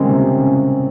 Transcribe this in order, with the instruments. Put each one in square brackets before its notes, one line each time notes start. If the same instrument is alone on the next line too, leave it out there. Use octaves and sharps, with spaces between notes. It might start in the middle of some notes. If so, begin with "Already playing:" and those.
Already playing: [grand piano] C#3 G3 G#3 A#3 C4
C3
C#3